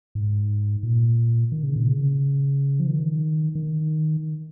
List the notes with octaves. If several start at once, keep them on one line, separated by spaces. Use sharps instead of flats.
G#2
A#2
D#3
C#3
A#2
C#3
F3
D#3
D#3